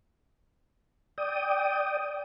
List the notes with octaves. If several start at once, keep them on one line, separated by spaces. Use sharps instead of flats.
D5 G5 D#6